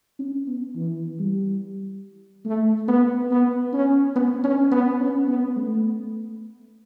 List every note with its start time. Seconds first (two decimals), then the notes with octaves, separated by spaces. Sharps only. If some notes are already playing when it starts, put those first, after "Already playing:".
0.19 C#4
0.47 B3
0.76 E3
1.19 G3
2.45 A3
2.88 B3
3.31 B3
3.73 C#4
4.16 B3
4.44 C#4
4.72 B3
5.00 C#4
5.27 B3
5.56 A3